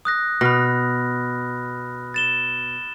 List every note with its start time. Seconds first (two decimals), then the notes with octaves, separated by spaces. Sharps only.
0.05 D#6 F#6 A#6
0.41 B2 B5 F6 A#6
2.14 A6 E7 G7